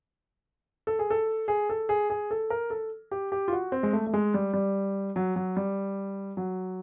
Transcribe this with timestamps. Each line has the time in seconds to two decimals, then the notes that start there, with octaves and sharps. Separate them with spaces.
0.87 A4
0.99 G#4
1.10 A4
1.48 G#4
1.70 A4
1.89 G#4
2.10 G#4
2.31 A4
2.50 A#4
2.70 A4
3.11 G4
3.32 G4
3.48 F4
3.53 F#4
3.72 C4
3.83 G#3
3.93 A3
4.07 A3
4.14 G#3
4.34 G3
4.54 G3
5.16 F#3
5.36 F#3
5.57 G3
6.37 F#3